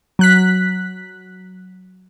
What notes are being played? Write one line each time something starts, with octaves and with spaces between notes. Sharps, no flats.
F#3 F#6 B6